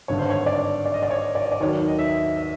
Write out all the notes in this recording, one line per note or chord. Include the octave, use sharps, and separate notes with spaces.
G#1 G2 D3 C#5
C5
C#5
D5
D5
D#5
D5
C#5
D5
D5
D#2 D#3 F#3 C#5
D#5
E5
E5